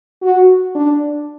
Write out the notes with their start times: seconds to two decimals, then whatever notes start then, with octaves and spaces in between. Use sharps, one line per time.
0.22 F#4
0.75 D4